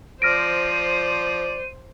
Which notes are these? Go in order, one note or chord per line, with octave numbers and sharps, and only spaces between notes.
F3 C5 D5 F6 A#6 D7 D#7